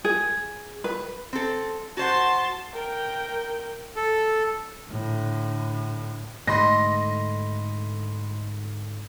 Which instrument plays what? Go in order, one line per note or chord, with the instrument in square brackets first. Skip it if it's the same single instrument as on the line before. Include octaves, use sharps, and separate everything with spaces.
[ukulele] G#4
B4
[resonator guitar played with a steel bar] C4 A4
[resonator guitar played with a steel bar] F#4 C5 F#5 [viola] A5 C6
[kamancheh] A#4 G5
[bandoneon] A4
[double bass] A2 D3
[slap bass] G#2 D3 A3 [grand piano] D#5 B5 C6 [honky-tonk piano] A#6